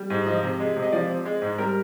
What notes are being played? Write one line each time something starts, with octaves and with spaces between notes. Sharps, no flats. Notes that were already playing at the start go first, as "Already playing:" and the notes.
Already playing: G3
G#2
F3 D#5
C3
G#3
C3
D#5
F3 D5
C4
G#3
G#2
G3 A#4